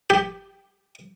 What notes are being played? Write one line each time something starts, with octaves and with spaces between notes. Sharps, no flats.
G4